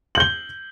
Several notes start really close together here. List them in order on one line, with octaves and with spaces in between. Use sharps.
F#7 G6 G7